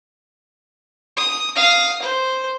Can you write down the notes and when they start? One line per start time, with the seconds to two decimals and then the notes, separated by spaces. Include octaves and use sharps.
1.17 D#6
1.56 F5 D#6
2.02 C5